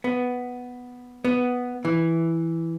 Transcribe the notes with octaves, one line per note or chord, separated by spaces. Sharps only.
B3
B3
E3